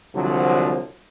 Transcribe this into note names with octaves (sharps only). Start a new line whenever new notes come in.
C2 D3 F3 F#3